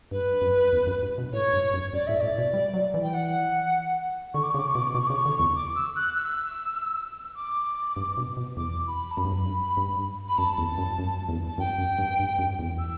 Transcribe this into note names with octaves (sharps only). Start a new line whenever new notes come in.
G2 B4
F#2
E2
F#2
G2
B2
A2 C#5
G2
F#2
F#2 D5
A2 E5
A2 D5
B2
G3
F#3
E3
G5
F#5
D3 C#6
D6
C#6
C#3
D6
C#6
B2 D6
C#6
D6
B2
C#6
C#3 D6
C#6
D3
E2
D6
E6
F#6
E6
D6
G2
B2
B2
E2 D6
B5
A5
F#2 B5
G2
F#2
G2
B5
F#2 A5
E2
F#2
F#2
E2
A5
F#2 G5
F#2
G2
G2
F#2
E2
E6